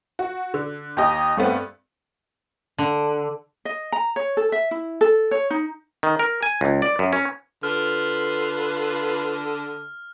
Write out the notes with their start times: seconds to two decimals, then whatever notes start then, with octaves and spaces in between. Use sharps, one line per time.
0.19 F#4
0.54 D3
0.97 D#2 G4 D#5
1.37 G2 A3 B3 C4
2.78 D3
3.65 D#5
3.92 A#5
4.16 C#5
4.37 A4
4.52 E5
4.71 E4
5.01 A4
5.31 C#5
5.50 D#4
6.03 D#3
6.19 A#4
6.43 G#5
6.61 C#2
6.82 D5
6.99 F#2
7.13 C#4
7.63 D3 F4 B4 F6